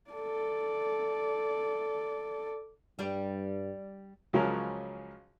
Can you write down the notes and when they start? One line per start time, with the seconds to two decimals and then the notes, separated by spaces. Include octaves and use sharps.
0.11 A4 D5
2.99 G2 G3 D4 G4
4.33 C#2 C#3 F3 F#3 C#4 A#4